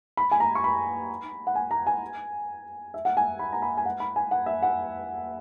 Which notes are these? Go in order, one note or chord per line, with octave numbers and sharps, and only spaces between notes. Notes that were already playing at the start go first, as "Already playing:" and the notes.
B5
G#5
A#5
C#6
B5
F#5
G#5
A#5
G#5
E5
F#5
G#5
B5
A#5
B5
G#5
F#5
B5
G#5
F#5
E5
F#5